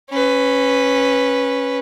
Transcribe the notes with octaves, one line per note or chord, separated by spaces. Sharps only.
C#4 B4